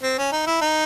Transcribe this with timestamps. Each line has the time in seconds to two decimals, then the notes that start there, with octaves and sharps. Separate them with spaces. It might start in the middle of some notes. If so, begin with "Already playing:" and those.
0.03 C4
0.18 C#4
0.32 D#4
0.47 E4
0.61 D#4